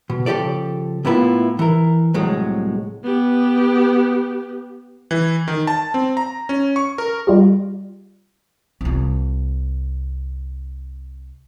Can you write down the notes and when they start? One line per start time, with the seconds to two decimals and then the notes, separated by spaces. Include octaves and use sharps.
0.10 B2
0.26 C#3 F3 G4 A4 D5
1.05 A2 A#3 B3 E4 F4
1.59 E3 A#4
2.14 C2 A2 F#3 G#3
3.04 B3 G4
5.11 E3
5.48 D#3
5.67 A5
5.94 C4
6.17 A#5
6.49 C#4
6.76 C#6
6.98 A#4
7.27 G3 F4 G4
8.81 C2 F4